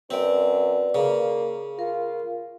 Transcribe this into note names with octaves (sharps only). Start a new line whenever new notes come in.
F#2 C4 B4 D5
C#3 A#3
F4 A#4